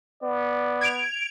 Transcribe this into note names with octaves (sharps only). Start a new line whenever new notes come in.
B3 D5
G#6 D7 F7